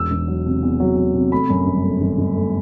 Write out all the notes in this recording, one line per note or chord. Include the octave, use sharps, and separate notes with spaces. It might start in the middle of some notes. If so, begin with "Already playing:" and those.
Already playing: E1 E6
E1
F#3
C3
E2
F#3
F#3
C3
A3 B5
F#2
G1
A3
G1
G1
A3